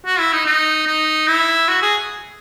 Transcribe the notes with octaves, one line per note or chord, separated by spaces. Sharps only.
F#4
E4
D#4
D#4
D#4
E4
F#4
G#4